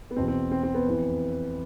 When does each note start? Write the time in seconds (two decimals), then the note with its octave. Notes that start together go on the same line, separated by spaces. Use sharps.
0.11 B3
0.16 E2 B2 C4
0.28 C4
0.52 C4
0.63 C4
0.74 B3
0.86 F2 E3